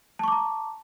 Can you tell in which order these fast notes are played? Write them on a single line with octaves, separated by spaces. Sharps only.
A5 C#6 D6 A#5